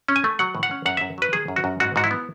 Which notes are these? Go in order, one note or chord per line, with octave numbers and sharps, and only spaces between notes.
C#4
G#5
A3
F#3 F#5
A2
F#5
C#4
F#2 F#5
F#2 E5
F#3 B4
D#3 G#4
F#2
F#4
F#2
G#2 F#4
G#2 F#4
E4
B3